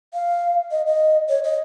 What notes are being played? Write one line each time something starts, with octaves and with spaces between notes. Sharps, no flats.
F5
D#5
D#5
C#5
D#5